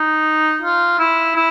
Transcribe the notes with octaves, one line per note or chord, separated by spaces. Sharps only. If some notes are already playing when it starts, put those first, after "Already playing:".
Already playing: D#4
F4
E4
E4